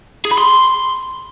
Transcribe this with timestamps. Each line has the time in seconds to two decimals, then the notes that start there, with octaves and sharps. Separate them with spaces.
0.25 G#4
0.31 B5
0.38 C6